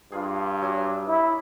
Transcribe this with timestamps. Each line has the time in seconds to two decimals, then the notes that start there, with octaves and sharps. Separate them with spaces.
0.12 G2 D4 F4 G#4
0.61 F#3 G#5 D6
1.08 E4